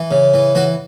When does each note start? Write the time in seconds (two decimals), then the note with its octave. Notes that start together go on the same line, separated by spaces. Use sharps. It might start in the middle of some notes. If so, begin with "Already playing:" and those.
Already playing: E3
0.11 C#3
0.34 E3
0.55 E3 F#4